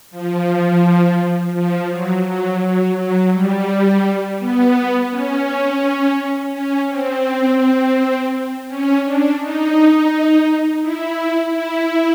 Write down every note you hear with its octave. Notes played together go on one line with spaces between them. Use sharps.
F3
F3
F#3
F#3
F#3
F#3
G3
B3
C#4
C#4
C4
C#4
D4
D#4
E4
E4